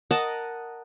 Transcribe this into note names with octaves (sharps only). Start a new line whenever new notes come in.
A#4 D#5 F#5 A5